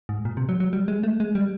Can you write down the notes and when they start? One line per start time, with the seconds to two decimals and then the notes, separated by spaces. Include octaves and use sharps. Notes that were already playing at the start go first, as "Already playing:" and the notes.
0.09 G#2
0.25 A#2
0.37 C3
0.49 F#3
0.60 F#3
0.73 G3
0.88 G#3
1.03 A3
1.20 G#3
1.35 G3